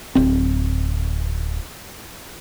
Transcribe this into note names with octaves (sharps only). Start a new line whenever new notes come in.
D1 C4